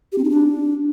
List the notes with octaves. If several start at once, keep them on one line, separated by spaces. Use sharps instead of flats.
G4
C4
D#4
D4